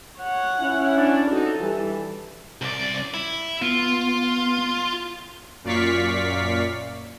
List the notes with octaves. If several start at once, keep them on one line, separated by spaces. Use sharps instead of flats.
C#5 F#5
C#4 E4
D4 D5
F2 D#4 F#4 A4
E3 G3
C2 D5
E4
B3 F4
F#2 A#2 D5 F5 C#6 B6